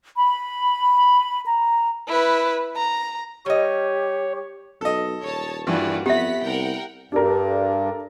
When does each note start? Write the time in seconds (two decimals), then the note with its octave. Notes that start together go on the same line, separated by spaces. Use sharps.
0.16 B5
1.45 A#5
2.08 E4 B4
2.76 A#5
3.46 G3 G4 C#5 D#5
4.81 B1 A4 D#5
5.23 D#1 C#5 A5
5.67 G2 E3 F4 F#4 D5
6.06 F2 B3 G4 E5 F#5 B6
6.42 C2 A#4 F#5 G5
7.12 G2 D4 G4 A4 A#4